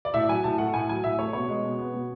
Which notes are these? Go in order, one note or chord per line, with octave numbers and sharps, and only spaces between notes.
D5
A2 E5
F#3 G#5
A2 A5
A3 F#5
A2 G#5
F#3 G#5
A2 E5
A3 C#5
B2 C#5
G#3
B2
B3
B2